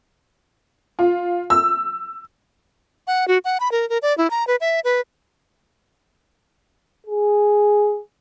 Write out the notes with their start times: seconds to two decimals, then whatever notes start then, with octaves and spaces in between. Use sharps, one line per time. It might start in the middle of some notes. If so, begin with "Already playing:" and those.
0.99 F4
1.50 E6
3.07 F#5
3.28 F#4
3.45 F#5
3.60 B5
3.72 A#4
3.90 A#4
4.02 D5
4.18 E4
4.31 A#5
4.47 B4
4.61 E5
4.84 B4
7.07 G#4